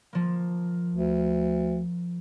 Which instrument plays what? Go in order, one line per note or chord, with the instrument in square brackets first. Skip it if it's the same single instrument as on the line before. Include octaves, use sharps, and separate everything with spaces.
[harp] F3 A#3
[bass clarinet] D2